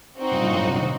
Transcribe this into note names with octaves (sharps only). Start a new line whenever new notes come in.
C4 D#4 F#4
G2 A#2
G2 A#2
F#2 A2
A2 C3
C3 D#3